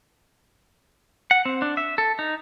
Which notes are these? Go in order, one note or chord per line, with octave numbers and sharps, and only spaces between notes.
F#5
C4
D4
E5
A4
D#4